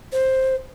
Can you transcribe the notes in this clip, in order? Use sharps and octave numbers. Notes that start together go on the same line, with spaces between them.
C5